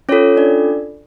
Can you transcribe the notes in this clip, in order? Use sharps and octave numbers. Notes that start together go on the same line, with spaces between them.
C#4 F4 A4 C#5
D4 D5